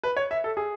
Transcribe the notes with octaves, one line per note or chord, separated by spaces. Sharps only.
B4
C#5
E5
A4
G#4